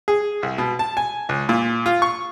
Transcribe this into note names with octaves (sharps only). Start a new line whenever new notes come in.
G#4
C2
B2
A5
G#5
C#2
A#2
F4
C#6